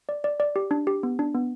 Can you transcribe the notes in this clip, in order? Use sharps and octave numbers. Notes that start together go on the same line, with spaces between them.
D5
D5
D5
G4
D4
G4
B3
D4
B3